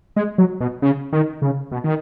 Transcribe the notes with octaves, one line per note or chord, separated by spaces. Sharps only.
G#3
F#3
B2
C#3
D#3
C#3
B2
D#3